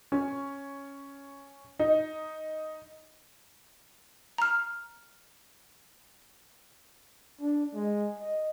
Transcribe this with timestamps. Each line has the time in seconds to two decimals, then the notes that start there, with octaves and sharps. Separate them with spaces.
0.12 C#4
1.79 D#4
4.38 A#5 F6
7.40 D4
7.74 G#3
8.19 D#5